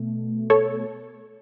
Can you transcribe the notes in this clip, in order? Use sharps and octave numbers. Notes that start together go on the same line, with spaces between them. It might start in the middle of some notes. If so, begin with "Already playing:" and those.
Already playing: B2 A3
A4 C#5